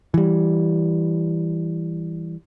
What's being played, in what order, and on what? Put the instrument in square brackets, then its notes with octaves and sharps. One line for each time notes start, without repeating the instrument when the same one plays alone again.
[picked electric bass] E3 G3